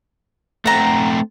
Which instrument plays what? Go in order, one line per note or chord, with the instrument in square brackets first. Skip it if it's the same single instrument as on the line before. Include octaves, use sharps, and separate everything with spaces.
[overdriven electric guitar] A3 C4 [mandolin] F#5 A#5